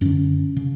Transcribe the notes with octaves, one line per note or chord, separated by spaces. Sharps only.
F#2 D3 C#4
C#3